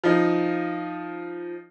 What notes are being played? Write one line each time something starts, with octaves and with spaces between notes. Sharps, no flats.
F3 D#4